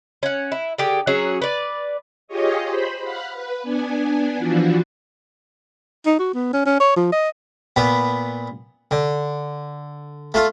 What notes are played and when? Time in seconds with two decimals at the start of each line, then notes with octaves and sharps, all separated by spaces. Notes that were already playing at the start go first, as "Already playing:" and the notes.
0.23 C#4 F#5
0.52 E4
0.78 D3 G4 G#4
1.07 F#3 C#4 F#4 G#4
1.42 B4 D5
2.28 F4 G4 G#4 C#5 D#5
2.66 C5 B5
3.02 F5 F#5 B5
3.32 B4
3.62 B3 D4 G#5
4.37 E3 F3 D4 F4 F#4
6.06 D#4
6.19 F#4
6.34 B3
6.53 C#4
6.66 C#4
6.80 C#5
6.96 F3
7.12 D#5
7.76 A#2 B3
8.91 D3
10.34 A3 F4